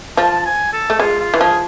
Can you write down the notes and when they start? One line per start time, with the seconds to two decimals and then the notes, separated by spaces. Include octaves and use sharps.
0.17 F3 A5
0.45 G#5
0.73 A4
0.90 A3
0.99 G#3 F4
1.20 F4
1.34 E3
1.41 F3 G#4